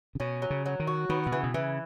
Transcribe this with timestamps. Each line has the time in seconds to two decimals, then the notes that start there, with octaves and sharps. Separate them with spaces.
0.15 C#3
0.20 B2 C#4
0.42 F#3
0.50 C#3
0.66 F#3
0.80 D#3
0.87 F#4
1.09 D#3 B3
1.26 B2
1.32 C#3 E3
1.43 B2
1.54 C#3 E3